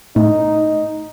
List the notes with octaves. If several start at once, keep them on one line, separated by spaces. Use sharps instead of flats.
A2 D#4